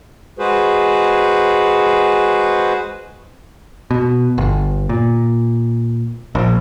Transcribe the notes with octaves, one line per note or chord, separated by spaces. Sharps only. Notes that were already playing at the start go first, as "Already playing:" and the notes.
G#3 F#4 G#4 B4 C5
B2
G1
A#2
A#1